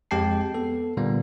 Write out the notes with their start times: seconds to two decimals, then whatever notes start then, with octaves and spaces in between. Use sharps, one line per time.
0.11 F2 G#3 G4 G5 A5 C7
0.54 B3 A4
0.97 A#2 D3 G3 A#3 B3